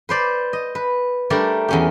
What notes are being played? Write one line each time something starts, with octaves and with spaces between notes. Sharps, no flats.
B4 C5 D5
D#5
B4
G3 A3 D4 A#4 D5
E2 C#4 G4